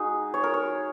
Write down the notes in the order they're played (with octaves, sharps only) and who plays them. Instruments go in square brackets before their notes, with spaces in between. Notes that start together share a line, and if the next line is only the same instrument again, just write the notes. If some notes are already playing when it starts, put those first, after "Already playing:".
Already playing: [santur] G#3 D#4 F#4 G#4
C#5
A#4
C#5